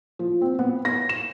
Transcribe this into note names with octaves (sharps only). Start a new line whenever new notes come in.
F3
C4
B3
A#6
E7